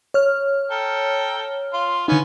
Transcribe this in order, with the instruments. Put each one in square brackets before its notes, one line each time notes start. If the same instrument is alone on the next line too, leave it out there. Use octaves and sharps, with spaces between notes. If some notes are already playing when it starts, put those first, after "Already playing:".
[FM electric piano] C#5 F6
[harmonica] A4 G5 A#5
F4 C6
[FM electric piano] D3 D#4 [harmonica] B3 C#4